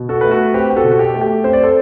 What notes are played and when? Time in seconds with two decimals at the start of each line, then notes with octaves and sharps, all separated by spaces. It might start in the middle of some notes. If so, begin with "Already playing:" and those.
Already playing: B2
0.09 F#4 A4
0.21 A3 B4
0.31 F#4 A4
0.54 C4 G4 B4
0.70 G4
0.76 F#4 A4
0.84 B2
0.91 F#4
0.99 G4
1.14 A3
1.21 G4
1.44 C4 C5
1.53 D5
1.63 A4 C5